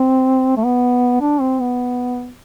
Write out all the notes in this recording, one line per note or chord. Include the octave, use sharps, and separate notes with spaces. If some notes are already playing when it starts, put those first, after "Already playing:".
Already playing: C4
A3
B3
D4
C4
B3